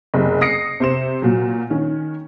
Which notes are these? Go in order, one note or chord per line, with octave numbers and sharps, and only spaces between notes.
F#1 C3
D#6 A#6 C7 C#7
C3 C5 E7
A#2 F#3
D#3 C#4